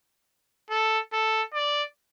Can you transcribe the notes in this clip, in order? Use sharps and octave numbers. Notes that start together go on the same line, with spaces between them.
A4
A4
D5